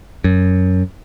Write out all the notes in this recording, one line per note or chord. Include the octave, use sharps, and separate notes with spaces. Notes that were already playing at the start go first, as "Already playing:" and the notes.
F#2